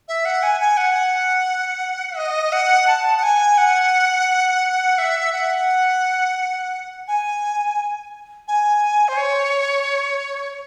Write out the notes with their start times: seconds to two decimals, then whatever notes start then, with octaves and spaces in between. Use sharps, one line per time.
0.08 E5
0.25 F#5
0.43 G#5
0.61 G#5
0.77 F#5
2.17 D#5
2.52 F#5
2.87 A5
3.17 F#5
3.23 G#5
3.58 F#5
4.98 E5
5.33 F#5
7.08 G#5
8.48 G#5
9.08 C5
9.17 C#5